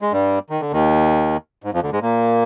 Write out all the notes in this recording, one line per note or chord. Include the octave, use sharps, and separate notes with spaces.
G#3
G2 G3
D#3
D3
D#2 D#3
G#2
F2 F3
D2 D3
G#2 G#3
A#2 A#3